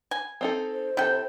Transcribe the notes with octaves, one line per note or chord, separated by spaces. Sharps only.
G#5
C4 D#4 A4
C5
C3 E4 A4 G5